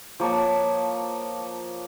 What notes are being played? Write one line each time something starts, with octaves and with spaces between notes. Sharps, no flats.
F3 A#3 C#5 A5